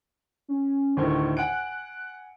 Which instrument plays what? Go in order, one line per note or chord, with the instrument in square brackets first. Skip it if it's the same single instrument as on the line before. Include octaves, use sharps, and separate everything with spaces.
[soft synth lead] C#4
[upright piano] D2 A2 D#3 [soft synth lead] C#6
[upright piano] F#5 G#5 D7 [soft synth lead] F#6